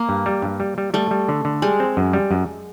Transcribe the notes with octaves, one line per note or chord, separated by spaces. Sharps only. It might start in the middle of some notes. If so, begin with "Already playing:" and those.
Already playing: A#3
G2
G3
G2
G3
G3
G3 A3
G3
D3
D3
G3 G#3
C4
F#2
G3
F#2